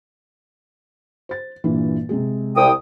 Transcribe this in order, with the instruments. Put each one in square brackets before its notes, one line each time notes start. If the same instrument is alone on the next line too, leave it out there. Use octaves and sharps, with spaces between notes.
[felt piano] C5 A6
G2 A#2 E3
C3 G#3 G#4
[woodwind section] C2 G5 D#6